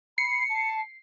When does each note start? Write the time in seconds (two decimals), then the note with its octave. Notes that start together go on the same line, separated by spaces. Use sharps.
0.18 B5 C7 C#7
0.49 A5